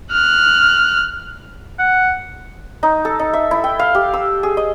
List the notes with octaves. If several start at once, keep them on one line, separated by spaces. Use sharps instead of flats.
F6 F#6
F#5
D#4
A4
D#4
E5
E4
G5
F5
G4
E6
G#4
D#5